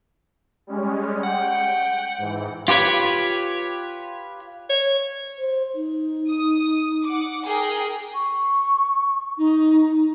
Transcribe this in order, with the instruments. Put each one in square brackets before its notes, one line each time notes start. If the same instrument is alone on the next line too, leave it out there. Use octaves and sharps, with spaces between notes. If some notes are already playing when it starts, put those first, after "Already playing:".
[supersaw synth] G3 G#3 C#4
[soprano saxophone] F#5 [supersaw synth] G5
[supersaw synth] G#2 E3
[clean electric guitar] F4 G4 B4 C#5
[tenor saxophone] C#5
[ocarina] C5
D#4
[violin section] D#6
F#5 D6
G#4 A#4 G5
[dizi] C#6
D#4